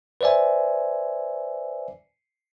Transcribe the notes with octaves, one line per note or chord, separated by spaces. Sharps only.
B4 C5 D5 E5 G#5